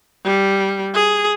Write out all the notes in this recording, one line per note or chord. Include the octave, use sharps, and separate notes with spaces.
G3
G#4